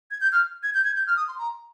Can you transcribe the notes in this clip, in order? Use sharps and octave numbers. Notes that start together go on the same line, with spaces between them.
G#6
G6
F6
G#6
G6
G#6
G6
F6
D#6
C6
A#5